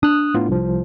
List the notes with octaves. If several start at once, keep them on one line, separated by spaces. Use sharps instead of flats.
D4 D#6 F#6
A2 B3 F4
C2 F3